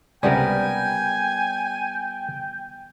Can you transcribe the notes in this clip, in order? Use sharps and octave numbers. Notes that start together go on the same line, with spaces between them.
C#2 C3 G3 B3 A#4 G5 G#5